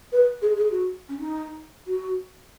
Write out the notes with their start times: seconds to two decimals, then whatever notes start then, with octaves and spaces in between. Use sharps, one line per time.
0.12 B4
0.42 G#4
0.56 G#4
0.71 F#4
1.09 C#4
1.19 D#4
1.87 F#4